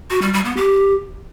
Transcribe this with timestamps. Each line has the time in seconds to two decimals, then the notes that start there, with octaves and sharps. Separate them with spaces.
0.10 F#4
0.22 G3
0.33 G3
0.45 B3
0.57 G4